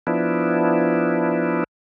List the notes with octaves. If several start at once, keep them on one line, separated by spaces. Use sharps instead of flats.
F3 B3 D4 E4